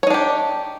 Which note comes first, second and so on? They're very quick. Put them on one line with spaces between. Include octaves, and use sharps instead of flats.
C#5 D#4 D4 G4